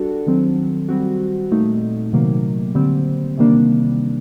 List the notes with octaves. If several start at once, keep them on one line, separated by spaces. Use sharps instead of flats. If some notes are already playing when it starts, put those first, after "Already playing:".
Already playing: G3 D4 F#4 A4
D#3 F#3 C4
G3 C4 F#4
A#2 A3 D#4
C3 D#3 F#3 A#3
D3 G3 C4
C3 D#3 G3 A#3 D4